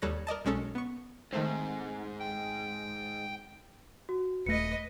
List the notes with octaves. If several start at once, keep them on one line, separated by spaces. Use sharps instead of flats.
D#2 G3 A4 C#5 F#6 A#6
A#4 D5 D#5 A5
B1 G#3 C#4 A4
B3 C#6
G#2 D#3 A3 C4
G5
F#4
D#1 A3 B4 D#5 A#6 C#7